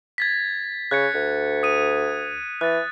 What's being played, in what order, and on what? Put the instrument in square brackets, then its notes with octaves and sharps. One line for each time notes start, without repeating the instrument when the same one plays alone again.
[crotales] G#6 A6 B6
[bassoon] C#3 [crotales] F#6 G#6 C#7
[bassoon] D2
[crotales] D#6 D#7
[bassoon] E3 [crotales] F#6 A6